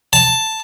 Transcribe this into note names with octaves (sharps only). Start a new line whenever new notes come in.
A5